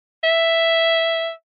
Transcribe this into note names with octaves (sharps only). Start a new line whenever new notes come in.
E5